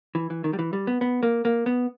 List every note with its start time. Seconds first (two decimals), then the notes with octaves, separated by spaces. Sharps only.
0.15 E3
0.30 E3
0.44 D#3
0.53 G3
0.59 E3
0.73 G3
0.87 B3
1.01 B3
1.23 A#3
1.45 A#3
1.66 B3